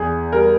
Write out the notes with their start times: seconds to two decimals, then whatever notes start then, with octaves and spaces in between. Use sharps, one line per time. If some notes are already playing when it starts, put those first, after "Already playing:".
Already playing: E2 G#4
0.33 G3 A#4